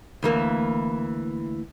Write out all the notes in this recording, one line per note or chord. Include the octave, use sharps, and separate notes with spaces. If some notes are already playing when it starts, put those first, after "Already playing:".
D2 E3 A#3